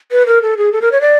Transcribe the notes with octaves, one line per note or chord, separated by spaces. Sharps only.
B4
A#4
A4
G#4
A4
A#4
C#5
D5